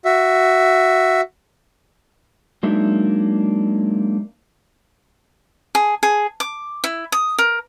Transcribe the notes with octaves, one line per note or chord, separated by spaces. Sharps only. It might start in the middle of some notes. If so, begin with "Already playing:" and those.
F#4 E5
F#3 G#3 A#3 D4 D#4 E5
G#4
G#4
D6
E4
D#6
A#4